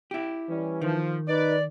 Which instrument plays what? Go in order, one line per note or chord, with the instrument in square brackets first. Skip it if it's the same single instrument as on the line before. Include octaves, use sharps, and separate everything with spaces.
[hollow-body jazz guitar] E4 G4
[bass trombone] E3 [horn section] G3 C#4
[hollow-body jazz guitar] D#3 [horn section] F3
[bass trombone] D#4 [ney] B4 [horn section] D5